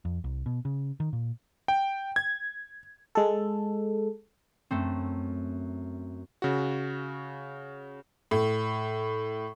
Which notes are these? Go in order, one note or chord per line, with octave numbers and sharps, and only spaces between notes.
F2
C2
B2
C#3
D#3
A#2
G5
G#6
G#3 A4
F#2 A3 C4
C#3 F#4
A2